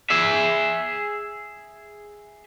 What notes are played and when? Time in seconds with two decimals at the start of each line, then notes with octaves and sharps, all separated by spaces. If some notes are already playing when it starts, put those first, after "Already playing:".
0.10 G#4 E5